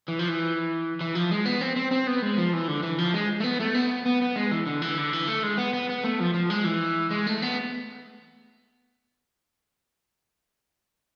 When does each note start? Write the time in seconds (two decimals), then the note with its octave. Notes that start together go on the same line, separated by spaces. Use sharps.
0.08 E3
0.19 F3
0.29 E3
1.01 E3
1.15 F3
1.31 G#3
1.46 B3
1.61 C4
1.76 C4
1.91 C4
2.07 B3
2.22 G#3
2.37 F3
2.53 E3
2.68 D3
2.83 E3
2.98 F3
3.14 G#3
3.40 A3
3.44 B3
3.60 A3
3.75 B3
4.06 B3
4.21 B3
4.36 G#3
4.51 E3
4.66 D3
4.82 E3
4.98 D3
5.13 E3
5.27 A3
5.43 G#3
5.58 B3
5.73 B3
5.89 B3
6.04 A3
6.20 F3
6.34 F3
6.50 G#3
6.65 E3
7.11 G#3
7.27 A3
7.42 B3